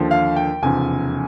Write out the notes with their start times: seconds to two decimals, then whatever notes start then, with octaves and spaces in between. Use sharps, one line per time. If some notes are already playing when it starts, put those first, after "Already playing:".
Already playing: D#2 D3 F3
0.11 F5
0.36 G5
0.62 F1 E2 C#3 F3 G#5